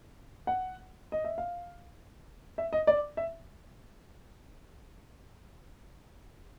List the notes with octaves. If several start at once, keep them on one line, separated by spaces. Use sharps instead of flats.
F#5
D#5
E5
F5
E5
D#5
D5
E5